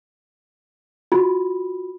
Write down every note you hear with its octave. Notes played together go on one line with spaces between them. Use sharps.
F4 F#4 B5